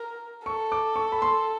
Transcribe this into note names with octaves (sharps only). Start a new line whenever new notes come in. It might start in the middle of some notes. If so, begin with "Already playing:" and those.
Already playing: A#4
A4 C#6
D6
C#6
B5
C6